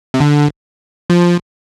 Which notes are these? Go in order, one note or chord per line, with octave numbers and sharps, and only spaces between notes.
C3
D3
F3